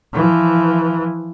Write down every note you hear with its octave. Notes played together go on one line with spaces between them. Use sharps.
E3 F3